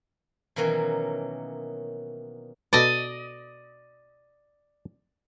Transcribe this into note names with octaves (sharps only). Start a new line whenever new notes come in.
B2 D#3 E3 F#3 A#3 C#4
B2 A4 B4 D5 D#5